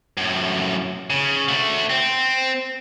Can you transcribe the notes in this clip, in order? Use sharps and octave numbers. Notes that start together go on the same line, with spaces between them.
F#2 A2
C#3
A3 F#4
C4